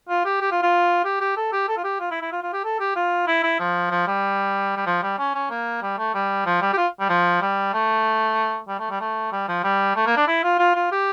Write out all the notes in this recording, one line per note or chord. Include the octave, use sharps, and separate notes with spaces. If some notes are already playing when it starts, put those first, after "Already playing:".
F4
G4
G4
F4
F4
G4
G4
A4
G4
A4
F4
G4
F4
E4
E4
F4
F4
G4
A4
G4
F4
E4
E4
F3
F3
G3
G3
F3
G3
C#4
C#4
A#3
G3
A3
G3
F3
G3
G4
F4
G3
F3
G3
A3
G3
A3
G3
A3
G3
F3
G3
A3
A#3
D4
E4
F4
F4
F4
G4